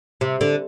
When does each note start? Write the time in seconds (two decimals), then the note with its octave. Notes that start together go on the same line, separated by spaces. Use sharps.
0.21 C3
0.41 D3